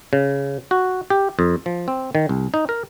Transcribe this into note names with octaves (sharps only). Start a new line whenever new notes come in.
C#3
F#4
G4
F2
F3
C4
D#3
C2
D#4
A#4